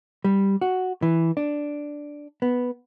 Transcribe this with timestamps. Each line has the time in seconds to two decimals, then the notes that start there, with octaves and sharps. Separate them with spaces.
0.24 G3
0.61 F#4
1.02 E3
1.37 D4
2.42 B3